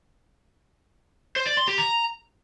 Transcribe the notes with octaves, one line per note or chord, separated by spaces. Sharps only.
C5
D5
C6
G4
A#5